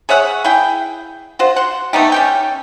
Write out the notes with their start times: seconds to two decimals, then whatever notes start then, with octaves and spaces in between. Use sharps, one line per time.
0.09 G#4 C#5 E5 F#5
0.44 E4 G#4 G5
1.39 F4 F#4 C5
1.56 F#5 C6
1.93 A3 B3 D#4 G4
2.12 C#4 G4 G5